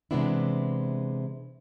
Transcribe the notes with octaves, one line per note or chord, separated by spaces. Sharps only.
C3 E3 G#3 B3 D4 E4